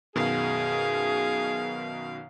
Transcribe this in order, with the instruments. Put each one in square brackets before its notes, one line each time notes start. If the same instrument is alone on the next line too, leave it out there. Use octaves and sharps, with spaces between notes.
[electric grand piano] F#2 B2 D#3 [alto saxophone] G#4 [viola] F5